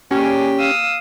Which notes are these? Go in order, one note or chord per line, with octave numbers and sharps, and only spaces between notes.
A#3 C#4 G4 G#4 D5
F5 D#6 E6